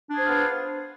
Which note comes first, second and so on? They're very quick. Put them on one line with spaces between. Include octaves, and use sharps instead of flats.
D4 G#4 C5 F4 B3